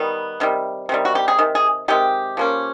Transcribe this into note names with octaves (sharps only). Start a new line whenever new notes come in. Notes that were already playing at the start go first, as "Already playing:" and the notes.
Already playing: D#3 G3 B3
C3 D#3 G3
C3 D#3 G3
F#4
G4
G#4
C3 D#3
G#4
C3 D#3 G#3 G4
F3 A#3 C#4